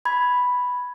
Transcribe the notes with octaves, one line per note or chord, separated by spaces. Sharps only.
B5 G#6